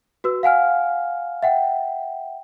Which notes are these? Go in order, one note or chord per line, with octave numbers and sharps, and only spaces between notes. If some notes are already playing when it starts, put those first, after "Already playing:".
F#4 B4 E6
F5 F#5 G#5 F6
E5 F#5 G5